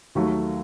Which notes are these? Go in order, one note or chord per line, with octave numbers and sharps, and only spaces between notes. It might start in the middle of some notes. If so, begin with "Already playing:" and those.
D#2 D#3 F#3 A3